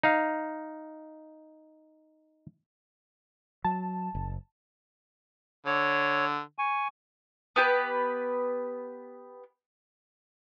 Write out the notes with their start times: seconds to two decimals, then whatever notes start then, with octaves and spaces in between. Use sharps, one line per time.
0.03 D#4 F5
3.64 F#3 A5
4.15 F#1
5.66 D3 C#5
6.59 G#5 C#6
7.56 B3 G4 A4 B4